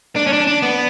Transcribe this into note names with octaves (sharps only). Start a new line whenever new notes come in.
D4
C#4
D4
D4
B3